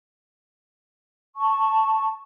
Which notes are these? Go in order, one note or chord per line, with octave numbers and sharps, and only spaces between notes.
A5 C#6